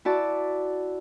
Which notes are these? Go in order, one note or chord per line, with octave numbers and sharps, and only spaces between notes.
E4 F#4 D5 A5